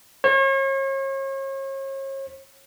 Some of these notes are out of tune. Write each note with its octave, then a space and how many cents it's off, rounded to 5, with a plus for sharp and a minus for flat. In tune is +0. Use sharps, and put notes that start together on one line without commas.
C#5 -40